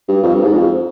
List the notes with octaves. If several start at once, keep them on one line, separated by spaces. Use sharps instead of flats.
G2
F2
G2
G#2
F2